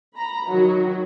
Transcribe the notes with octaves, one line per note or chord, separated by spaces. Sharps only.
A#5 B5
D#3 F#3 F#4